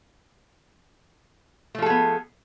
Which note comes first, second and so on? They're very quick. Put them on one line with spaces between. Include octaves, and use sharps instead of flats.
A3 F3 A4 G#4 B3